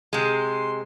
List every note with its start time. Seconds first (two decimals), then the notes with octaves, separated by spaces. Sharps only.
0.13 C3 G#3 C6